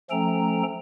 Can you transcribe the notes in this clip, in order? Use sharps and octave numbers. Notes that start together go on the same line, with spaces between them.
F3 A3 C#4 A4 G5 A#5